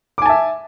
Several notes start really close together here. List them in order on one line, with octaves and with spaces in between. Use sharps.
D6 G#5 A5 E5